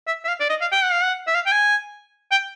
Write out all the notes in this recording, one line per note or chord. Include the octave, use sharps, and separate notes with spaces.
E5
E5
F5
D5
D#5
F5
G5
F#5
F5
F#5
E5
F5
G5
G#5
G5